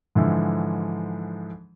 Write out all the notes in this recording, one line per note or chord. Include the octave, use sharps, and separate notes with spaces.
G#2 D3 E3 F3